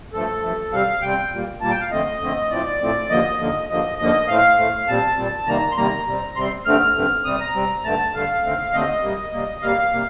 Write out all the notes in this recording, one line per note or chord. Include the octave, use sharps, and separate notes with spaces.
G2 F3 A3 A4
G2 F3 A3
C3 G3 C4 F5
C3 G3 C4 G5
A#2 G3 A#3
A#2 G3 A#3 A5
G5
F5
F2 D3 A3 C4 D#5
F2 D3 A3 C4
A2 F3 A3 C4 D5
A2 F3 A3 C4
D#2 D3 F3 A#3 D#5
D#2 D3 F3 A#3
D#2 D3 F3 A#3 D#5
D#2 D3 F3 A#3 D#5
A2 A3 C4 F5
A2 A3 C4
A#2 G3 C4 A5
A#2 G3 C4
C3 D#3 G3 A#3 A#5
C6
C3 D#3 G3 A#3 A#5
C3 G3 C4
C3 G3 C4 C6
G2 D3 A3 C4 F6
G2 D3 A3 C4
C3 G3 C4 D#6
A#5
C3 G3 C4
G2 D3 A3 A5
G2 D3 A3 F5
D#2 D3 A3 C4
D#2 D3 A3 C4 D#5
C3 G3 A#3
C3 G3 A#3
C3 G3 A#3 F5
C3 G3 A#3